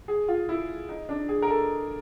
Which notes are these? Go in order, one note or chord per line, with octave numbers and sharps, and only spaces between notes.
G#4
F4
E4
D#4
D4
G#4
A#4
A4